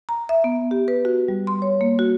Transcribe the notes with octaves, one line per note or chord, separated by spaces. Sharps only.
A#5
E5
B3
G4
B4
F#4
G3
C6
C#5
A#3
F#4